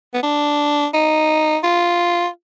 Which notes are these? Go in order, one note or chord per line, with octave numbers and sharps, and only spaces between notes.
B3
D4
D#4
F4